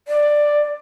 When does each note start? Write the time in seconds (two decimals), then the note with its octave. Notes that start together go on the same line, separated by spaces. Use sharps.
0.08 D5